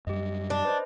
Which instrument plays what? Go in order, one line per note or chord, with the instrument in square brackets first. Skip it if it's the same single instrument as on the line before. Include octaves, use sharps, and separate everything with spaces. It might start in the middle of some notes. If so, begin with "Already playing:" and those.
[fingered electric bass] F#2 G3 [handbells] G4 D#5
[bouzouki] D4
[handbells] B4 C5 D#5